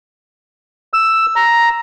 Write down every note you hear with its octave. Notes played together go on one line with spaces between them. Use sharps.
E6
A#5